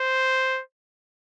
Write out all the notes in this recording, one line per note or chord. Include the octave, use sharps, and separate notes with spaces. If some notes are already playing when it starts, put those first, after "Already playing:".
Already playing: C5